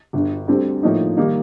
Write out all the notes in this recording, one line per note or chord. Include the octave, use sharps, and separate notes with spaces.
G1 G2 D3
D2 D3 G3 C4
A2 F3 A#3 D#4
D#3 G3 A#3 D#4